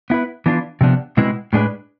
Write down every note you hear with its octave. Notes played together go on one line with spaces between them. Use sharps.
B3 E4 B4
E3 B3 D4 F4
C3 F3 B3 D4
B2 G#3 C4 E4 B4
A2 G#3 D4 G#4 B4